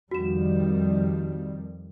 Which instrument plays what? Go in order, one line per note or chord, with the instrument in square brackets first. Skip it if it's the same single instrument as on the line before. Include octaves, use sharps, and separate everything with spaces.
[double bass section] F2 D#3 G3 [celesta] F#4 E7